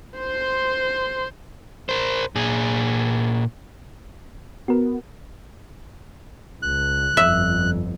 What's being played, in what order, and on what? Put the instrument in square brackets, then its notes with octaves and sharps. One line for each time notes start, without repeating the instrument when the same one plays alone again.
[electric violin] C5 C6
[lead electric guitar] A#4 C5
A#2 G#4
[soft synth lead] B3 [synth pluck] F#4 A#4
[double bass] C#2 [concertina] F#6
[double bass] G1 F2 [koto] E5